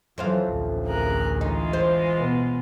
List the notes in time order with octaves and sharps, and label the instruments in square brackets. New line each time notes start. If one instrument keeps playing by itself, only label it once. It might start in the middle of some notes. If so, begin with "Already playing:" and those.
[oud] F2 C5 F5 [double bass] E3 F#3
[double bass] A1 D2
[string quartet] G#4 A#4 F#6
[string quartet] E3 G#3 F4 [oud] D#4
[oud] C5
[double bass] B2 B3